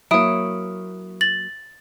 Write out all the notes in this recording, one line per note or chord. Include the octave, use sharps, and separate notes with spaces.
F#3 A#3 E4 C#5 D#6 D7
A6 F#7